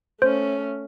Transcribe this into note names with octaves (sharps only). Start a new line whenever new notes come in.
A3 C#4 C5